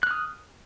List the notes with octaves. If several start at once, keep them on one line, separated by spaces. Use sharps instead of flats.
D#6 F6 F#6